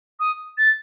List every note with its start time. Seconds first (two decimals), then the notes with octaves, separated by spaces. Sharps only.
0.19 D#6
0.57 A6